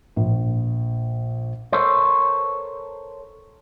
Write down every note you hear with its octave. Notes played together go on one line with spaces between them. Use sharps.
A#1
A4 A#4 C5 C#5